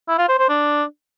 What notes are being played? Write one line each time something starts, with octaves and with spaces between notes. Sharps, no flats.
E4
F4
C5
C5
D4